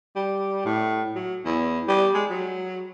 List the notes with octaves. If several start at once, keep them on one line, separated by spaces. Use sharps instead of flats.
G3
A2
F#3
E2
G3
G#3
F#3